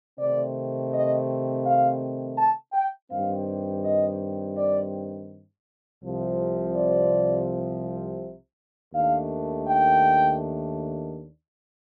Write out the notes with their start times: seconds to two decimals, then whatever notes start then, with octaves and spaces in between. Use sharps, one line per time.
0.18 C3 D#3 A3 C4 D5
0.92 D#5
1.64 F5
2.38 A5
2.73 G5
3.10 G2 D#3 G3 C4 F5
3.82 D#5
4.56 D5
6.02 C2 C3 F3
6.75 D5
8.93 D#2 D#3 A3 D4 F5
9.66 G5